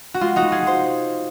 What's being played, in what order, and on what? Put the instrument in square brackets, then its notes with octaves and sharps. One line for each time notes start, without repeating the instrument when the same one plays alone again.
[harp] F#4
G#3 F4
D#4 F#4
G#3
F4 G#4
G#3
C5